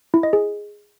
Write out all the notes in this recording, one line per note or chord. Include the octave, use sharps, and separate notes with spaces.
E4
D#5
G#4